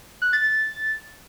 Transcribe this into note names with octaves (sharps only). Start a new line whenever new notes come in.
F#6
A6
A6